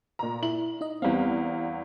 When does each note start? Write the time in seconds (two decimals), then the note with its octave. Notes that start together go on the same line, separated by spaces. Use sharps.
0.19 A#2 A#5
0.43 E4 F#7
0.81 D#4 D#5
1.02 E2 G3 B3 C4 F5